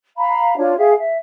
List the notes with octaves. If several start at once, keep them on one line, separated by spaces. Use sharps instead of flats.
F5 A#5 B5
D4 F4 C#5
G#4 E5 F5 G5
E5